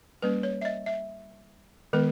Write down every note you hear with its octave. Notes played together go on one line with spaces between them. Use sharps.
G3 A#3 C#4 B4
C#5
E5
D#5
E5
D#3 G#3 B3 B4